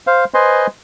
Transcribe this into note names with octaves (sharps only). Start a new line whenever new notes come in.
C5 F5
B4 C5 D#5 G#5 C6